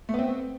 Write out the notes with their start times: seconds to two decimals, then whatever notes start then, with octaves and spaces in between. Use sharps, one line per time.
0.09 A3
0.14 B3
0.19 C4